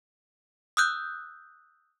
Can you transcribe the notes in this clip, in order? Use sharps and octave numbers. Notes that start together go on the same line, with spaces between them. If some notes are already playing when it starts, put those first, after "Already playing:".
D#6 E6 F#6 G6